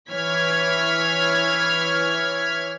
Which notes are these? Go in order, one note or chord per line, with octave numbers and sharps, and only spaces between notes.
E3 C#5 F6 G#6 B6